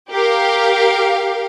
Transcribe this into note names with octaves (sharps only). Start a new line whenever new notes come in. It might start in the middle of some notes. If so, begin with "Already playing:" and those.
G4 A#4 F5